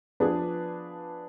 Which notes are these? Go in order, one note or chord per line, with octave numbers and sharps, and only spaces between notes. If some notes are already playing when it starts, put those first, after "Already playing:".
F3 B3 D4 G#4 B4